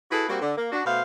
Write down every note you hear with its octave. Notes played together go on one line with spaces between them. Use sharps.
E4 F#4 G#4 A4 B4
G3 A#3 C4 F#4
D3
A#3
D4 F#4
B2 A3 C5 F5